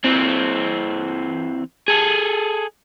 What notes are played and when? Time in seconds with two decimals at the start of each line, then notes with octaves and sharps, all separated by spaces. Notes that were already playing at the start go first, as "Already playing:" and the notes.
0.04 E3 C4
1.88 G#4 A4